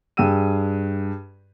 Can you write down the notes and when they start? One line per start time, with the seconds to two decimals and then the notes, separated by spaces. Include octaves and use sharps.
0.17 G2 G#4 G5 E6 D#7